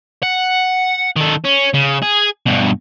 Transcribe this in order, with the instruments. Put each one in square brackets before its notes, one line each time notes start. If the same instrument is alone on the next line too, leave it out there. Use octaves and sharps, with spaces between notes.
[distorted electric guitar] F#5
D#3 A4
C#4
C#3
G#4
G2 B2